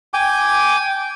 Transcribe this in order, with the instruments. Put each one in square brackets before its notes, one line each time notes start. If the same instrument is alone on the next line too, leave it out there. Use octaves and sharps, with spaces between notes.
[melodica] G5 G#5 D6